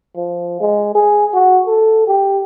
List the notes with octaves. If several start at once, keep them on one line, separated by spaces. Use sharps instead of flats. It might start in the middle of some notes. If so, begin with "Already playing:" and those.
F3
G#3
G#4
F#4
A4
G4